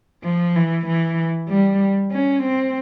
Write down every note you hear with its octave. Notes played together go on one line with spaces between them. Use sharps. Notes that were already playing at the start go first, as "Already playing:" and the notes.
F3
E3
E3
G3
C#4
C4